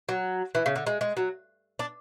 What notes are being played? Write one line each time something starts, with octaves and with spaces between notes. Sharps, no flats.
F#3
E3
C#3
D3
G#3
G#3
F#3
D4